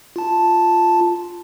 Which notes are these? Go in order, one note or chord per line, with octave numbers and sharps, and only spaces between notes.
F4 A5